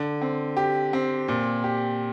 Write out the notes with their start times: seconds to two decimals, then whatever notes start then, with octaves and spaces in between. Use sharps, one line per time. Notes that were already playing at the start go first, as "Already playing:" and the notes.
Already playing: D3
0.22 C4
0.57 G4
0.93 C4
1.28 A#2
1.64 G4